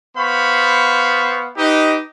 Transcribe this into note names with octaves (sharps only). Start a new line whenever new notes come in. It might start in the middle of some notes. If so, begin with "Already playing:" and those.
B3 C5 F5 B5 C#6
D#4 G4 B4 D#5